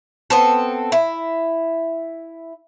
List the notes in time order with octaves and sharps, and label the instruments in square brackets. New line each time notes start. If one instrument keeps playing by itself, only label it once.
[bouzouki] B3 C4 A4
E4